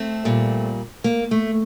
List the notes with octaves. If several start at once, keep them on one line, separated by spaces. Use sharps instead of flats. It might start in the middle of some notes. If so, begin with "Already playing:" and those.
Already playing: A3 C4
A#2 G3
A#3
A3